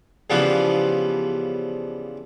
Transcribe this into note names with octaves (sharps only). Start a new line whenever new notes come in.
C#3 E3 F3 G3 B3 F4